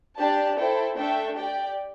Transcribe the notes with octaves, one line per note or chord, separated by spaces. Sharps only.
D4 G4 D5 A5
E4 A4 C5 G5
A3 D4 A4 E5 G5
G4 D5 G5